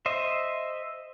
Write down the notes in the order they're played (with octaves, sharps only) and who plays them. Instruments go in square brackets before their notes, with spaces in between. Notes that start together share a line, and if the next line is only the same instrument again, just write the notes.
[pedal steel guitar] C5 D#5 E5